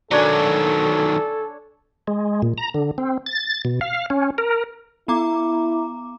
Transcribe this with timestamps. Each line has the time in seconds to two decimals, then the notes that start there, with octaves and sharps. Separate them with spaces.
0.11 D#3 F#3 D4 A4 C#5 G#5
2.08 G#3
2.42 A#2
2.58 A#5
2.74 D3
2.98 C4
3.26 A6
3.65 B2
3.81 F5
4.10 C#4
4.38 A#4
5.08 B3 E4 A#5 D6